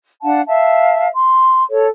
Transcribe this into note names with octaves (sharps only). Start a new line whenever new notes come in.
D4 F5 F#5 A5
E5 F5 A5
C6
A4 C#5